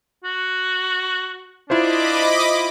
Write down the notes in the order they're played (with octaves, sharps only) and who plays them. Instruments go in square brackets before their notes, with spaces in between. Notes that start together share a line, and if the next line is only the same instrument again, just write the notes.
[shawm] F#4
[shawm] D4 [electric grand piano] E4 F4 C5 [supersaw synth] D#5 B5 D6